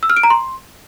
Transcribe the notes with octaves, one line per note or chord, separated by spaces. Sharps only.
E6
F6
D7
A#5
C6